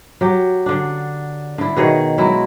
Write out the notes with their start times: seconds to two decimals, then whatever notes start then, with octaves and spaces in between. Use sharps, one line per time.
0.21 F#3 G4
0.66 D3 D4
1.58 D3 E4
1.76 B2 D#3 G#4 C#5
2.18 F#3 G#3 E4